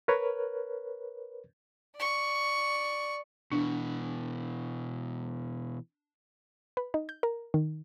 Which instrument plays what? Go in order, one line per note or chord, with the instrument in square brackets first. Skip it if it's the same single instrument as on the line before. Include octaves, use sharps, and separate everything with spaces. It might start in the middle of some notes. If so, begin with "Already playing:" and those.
[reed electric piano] A#4 B4 C#5
[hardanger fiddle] D5 C#6
[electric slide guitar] B2 E3 [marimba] D4
[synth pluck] B4
D#4
G6
A#4
D#3